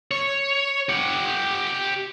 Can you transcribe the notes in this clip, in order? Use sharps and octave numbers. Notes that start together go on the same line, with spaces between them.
C#5
G4 F#5